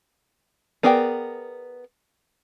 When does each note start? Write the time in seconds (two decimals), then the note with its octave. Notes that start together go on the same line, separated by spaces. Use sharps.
0.83 B3 G#4 A#4 D5 G5